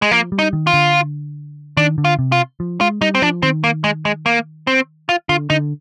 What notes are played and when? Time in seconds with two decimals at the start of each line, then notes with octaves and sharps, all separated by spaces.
0.02 G#3
0.11 F3 A#3
0.32 G3
0.39 D#4
0.53 D#3
0.67 F4
0.74 D3
1.77 D#3 D4
1.98 D3
2.05 F4
2.19 C3
2.32 F4
2.60 F3
2.80 G#3 F4
3.01 G3 D#4
3.15 C4
3.22 F3 D4
3.43 D#3 C4
3.64 A#3
3.84 G#3
4.05 G#3
4.26 A#3
4.67 C4
5.09 F4
5.29 D3 F4
5.50 D3 D#4